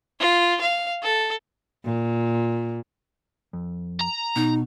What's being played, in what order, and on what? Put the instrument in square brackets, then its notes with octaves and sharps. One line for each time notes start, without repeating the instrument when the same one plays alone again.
[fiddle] F4
F5
A4
[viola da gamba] A#2
[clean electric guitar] F2
[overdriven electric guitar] A#5
[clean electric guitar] B2 [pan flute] D#4